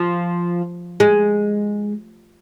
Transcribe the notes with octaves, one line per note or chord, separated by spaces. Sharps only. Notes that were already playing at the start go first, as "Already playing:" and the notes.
Already playing: F3
G#3